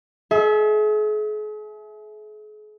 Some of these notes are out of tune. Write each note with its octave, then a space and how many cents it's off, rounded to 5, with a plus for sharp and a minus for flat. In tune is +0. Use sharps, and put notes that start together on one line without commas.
G#4 +40 E5 -10